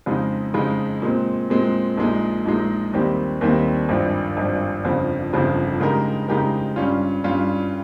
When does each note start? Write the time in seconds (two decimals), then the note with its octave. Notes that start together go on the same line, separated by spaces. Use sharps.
0.06 F2 C#3 G#3 D#4
0.54 F2 C#3 G#3 D#4
1.02 A#2 G#3 C4
1.50 A#2 G#3 C4
1.97 A#1 A#2 G#3 D#4
2.46 A#1 A#2 G#3 D#4
2.93 D#2 D#3 G3 C4 G4
3.41 D#2 D#3 G3 C4 G4
3.89 G#1 G2 F3
4.37 G#1 G2 F3
4.85 G1 F2 C#3 F3
5.33 G1 F2 C#3 F3
5.80 C#3 G#3 D#4 G4 A#4
6.28 C#3 G#3 D#4 G4 A#4
6.76 G2 G3 C#4 F4
7.24 G2 G3 C#4 F4